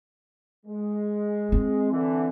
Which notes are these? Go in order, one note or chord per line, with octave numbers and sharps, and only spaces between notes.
G#3
C4
D3 E3